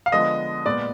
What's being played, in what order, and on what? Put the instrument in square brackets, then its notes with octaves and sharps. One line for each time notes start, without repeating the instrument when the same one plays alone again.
[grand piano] F5
D3 F3 G#3 B3 D#5
A#2 G#3 B3 D5